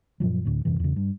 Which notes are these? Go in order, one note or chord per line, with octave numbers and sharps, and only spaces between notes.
F#2 A#2 F3 F#3
D2 A2
D#1 F#2 C3 E3
E2 C#3
G2